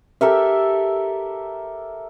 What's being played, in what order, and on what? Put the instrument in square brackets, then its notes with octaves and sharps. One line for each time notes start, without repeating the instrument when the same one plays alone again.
[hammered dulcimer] G4 A4 A#4 E5